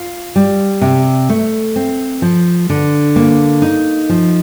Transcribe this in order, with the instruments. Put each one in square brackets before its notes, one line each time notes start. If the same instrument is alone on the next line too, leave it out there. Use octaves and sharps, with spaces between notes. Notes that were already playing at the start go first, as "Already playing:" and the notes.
Already playing: [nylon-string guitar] F4
G3
C3
A3
C4
F3
D3
A#3
D#4
F3